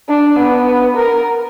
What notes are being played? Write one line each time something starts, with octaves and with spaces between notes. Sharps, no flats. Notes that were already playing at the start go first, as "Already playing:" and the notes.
D4
B3
A#4